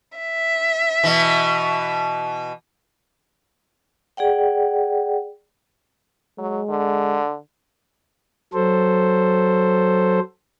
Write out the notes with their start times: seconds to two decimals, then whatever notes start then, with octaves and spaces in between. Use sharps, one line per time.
0.17 E5
1.04 B2 E3
4.17 G#4 D5 F#5 G5
6.38 F#3 G#3
6.70 D3
8.53 F#3 A4 C5